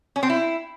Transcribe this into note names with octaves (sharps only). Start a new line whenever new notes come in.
C#4
C4
E4